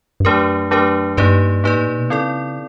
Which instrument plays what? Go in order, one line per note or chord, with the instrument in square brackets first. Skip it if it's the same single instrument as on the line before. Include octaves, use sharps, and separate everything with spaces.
[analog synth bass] G2
[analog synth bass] F#2 [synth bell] F#3 A3 D4 G4 A#4
[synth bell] F#3 A3 D4 G4 A#4
[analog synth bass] G2 [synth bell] A#3 D#4 G4 B4 D5
[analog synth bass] G#2 [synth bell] A#3 D#4 G4 B4 D5
[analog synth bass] A2
A#2
B2
[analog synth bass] C#3 [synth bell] C4 E4 A4 D5